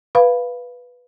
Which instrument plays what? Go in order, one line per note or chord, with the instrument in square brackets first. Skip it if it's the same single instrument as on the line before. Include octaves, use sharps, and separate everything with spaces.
[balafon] B4 F5 B5